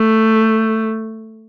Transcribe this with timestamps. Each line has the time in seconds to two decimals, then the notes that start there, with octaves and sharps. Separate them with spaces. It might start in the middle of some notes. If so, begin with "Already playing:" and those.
Already playing: A3